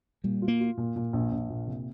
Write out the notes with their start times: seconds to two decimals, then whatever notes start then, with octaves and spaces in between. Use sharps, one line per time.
0.24 A#2 G3
0.42 F4
0.48 A#3
0.61 F4
0.77 A#2
0.96 A#2
1.13 A#1
1.32 A#1
1.50 A#2
1.67 C3